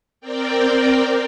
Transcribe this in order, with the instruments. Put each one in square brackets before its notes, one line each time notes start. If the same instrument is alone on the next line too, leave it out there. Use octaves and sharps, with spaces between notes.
[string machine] C4 A#4 D5 G5